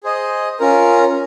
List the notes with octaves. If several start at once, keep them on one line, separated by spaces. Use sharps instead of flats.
G#4 C5 D#5
C#4 F4 A#4